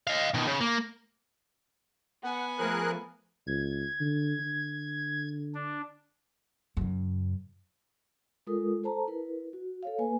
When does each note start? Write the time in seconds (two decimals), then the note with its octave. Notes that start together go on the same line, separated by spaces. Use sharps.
0.07 D#5 F5
0.34 B2 D#3
0.47 C#3
0.60 A#3
2.23 B3 F#5 G#5
2.59 F3 A3 G#4 A#4 F#6
3.47 C#2 G#6
4.01 D3
4.40 D3
5.55 D4
6.77 F#2 C#3
8.47 G#3 F4 A4 A#4 D#6
8.84 A4 C5 A5 A#5
9.07 E4 A#4 B4
9.53 F#4
9.83 A4 C#5 F5
9.98 A#3 B4 G#5